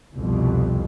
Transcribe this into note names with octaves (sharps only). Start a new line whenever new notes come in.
C2 F2 B2